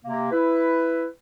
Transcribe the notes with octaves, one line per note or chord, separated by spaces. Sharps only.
C3 A#3
E4 B4